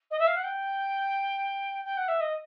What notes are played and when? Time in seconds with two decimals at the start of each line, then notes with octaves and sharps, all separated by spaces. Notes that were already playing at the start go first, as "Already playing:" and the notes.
0.10 D#5
0.19 E5
0.27 F5
0.36 F#5
0.43 G5
1.84 G5
1.97 F#5
2.08 E5
2.20 D#5